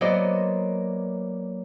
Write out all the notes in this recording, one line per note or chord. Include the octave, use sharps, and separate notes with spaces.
F#3 A#3 B3 C5 D5 D#5